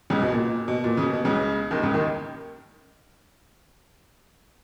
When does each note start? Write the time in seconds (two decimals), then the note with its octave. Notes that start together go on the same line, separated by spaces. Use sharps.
0.10 C#2 C#3
0.22 B2
0.32 A#2
0.68 B2
0.84 A#2
0.97 C#3
1.02 B2
1.13 B2
1.25 C#2 C#3
1.71 D#2 D#3
1.83 C#2 C#3
1.94 D#2 D#3